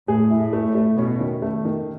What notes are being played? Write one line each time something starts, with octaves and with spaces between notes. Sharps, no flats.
A2 G#4
E4
A2
A3
A2
A3
B2 C#4
D#3
A3
D#3